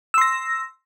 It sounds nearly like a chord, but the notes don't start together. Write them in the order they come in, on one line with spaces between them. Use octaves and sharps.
E6 C6 A#6